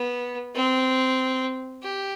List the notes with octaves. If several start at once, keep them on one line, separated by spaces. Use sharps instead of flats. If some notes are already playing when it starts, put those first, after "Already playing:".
Already playing: B3
C4
G4